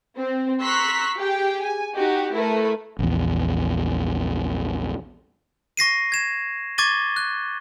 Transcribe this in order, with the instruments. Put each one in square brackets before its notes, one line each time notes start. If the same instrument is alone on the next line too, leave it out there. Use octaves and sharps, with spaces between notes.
[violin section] C4
A#5 C6 C#6 E6 F#6 B6
G4 G#4 G5
G#5
D#4 F#4 G4
A3 E4 A#4 B4
[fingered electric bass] A#1 E2
[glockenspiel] C#6 A#6 C7 D#7
G#6 E7
C#6 D6 G#6 A6 D#7 G7
F#6